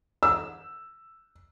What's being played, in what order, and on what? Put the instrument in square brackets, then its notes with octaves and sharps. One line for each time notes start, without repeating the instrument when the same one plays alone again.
[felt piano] E6